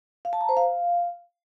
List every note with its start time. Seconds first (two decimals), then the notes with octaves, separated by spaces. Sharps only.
0.25 F5
0.33 A5
0.41 A#5
0.49 C5
0.57 F5